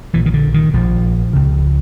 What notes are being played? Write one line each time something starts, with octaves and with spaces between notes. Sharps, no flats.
A#1 A#2 E3
D#3
D3
D#3
A#1 A#2 F3
C#2 C#3